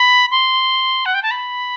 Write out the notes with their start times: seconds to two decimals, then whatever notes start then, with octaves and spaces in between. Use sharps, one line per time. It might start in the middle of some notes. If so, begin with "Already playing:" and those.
Already playing: B5
0.31 C6
1.06 F#5
1.14 G5
1.23 A5
1.31 B5